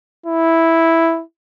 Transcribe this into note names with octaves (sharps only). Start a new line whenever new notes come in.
E4